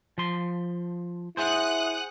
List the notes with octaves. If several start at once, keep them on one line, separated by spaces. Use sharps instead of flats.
F3 C6
E4 G#4 C5 F#5 D#6 F#6